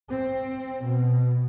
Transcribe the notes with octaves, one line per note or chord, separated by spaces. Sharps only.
C4
B2